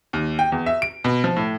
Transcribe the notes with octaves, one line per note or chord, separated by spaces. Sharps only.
D#2
G5
E2
E5
D7
B2
F3
A2